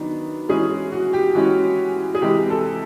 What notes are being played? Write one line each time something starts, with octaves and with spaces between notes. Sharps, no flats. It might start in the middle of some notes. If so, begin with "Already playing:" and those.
Already playing: D#3 F#3 B3 D4
E3 G#3 C#4 G#4
F#4
G4
E3 G#3 C#4 F#4
G#4
C3 E3 G#3 G4
A4